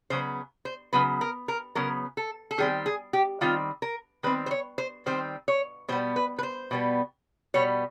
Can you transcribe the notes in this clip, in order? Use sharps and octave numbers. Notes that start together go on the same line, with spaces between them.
C#3 F#3 B3 C5
C5
C#3 F#3 B3 B4
A#4
A#4
C#3 F#3 B3 A#4
A4
A4
D#3 G3 C4 G#4
G#4
G4
D#3 G3 C4 F4
A#4
D#3 G3 C4 B4
C5
C#5
C5
D#3 G3 C4 C5
C#5
B2 G3 B3 C5
B4
B4
C5
B2 G3 B3
B2 G3 B3 C#5